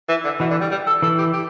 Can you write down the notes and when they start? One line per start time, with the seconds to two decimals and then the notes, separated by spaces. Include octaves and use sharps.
0.09 E3
0.24 D3
0.40 B2 E3
0.51 D3
0.61 G3
0.71 G3
0.87 A4
1.02 E3 A4
1.18 G4
1.34 G4